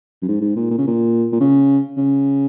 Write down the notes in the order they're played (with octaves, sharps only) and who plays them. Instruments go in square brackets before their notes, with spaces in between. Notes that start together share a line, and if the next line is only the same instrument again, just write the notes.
[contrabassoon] F#2
G#2
G#2
A#2
A#2
C#3
A#2
A#2
C#3
C#3